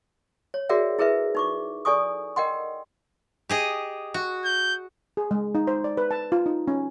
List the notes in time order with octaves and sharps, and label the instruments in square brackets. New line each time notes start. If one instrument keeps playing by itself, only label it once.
[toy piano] C#5
F#4 G#4 A#4 D5 E5 F#5
E4 G#4 A#4 B4 E5
D#4 C#6 D6
A4 D5 G#5 C#6 D#6
A#4 D#5 F#5 G5 C6
[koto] G4 G#4 D#5
F#4
[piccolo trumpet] G6
[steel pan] G#4
G#3
D#4
C5
D5
B4
A5
F4
D#4
C#4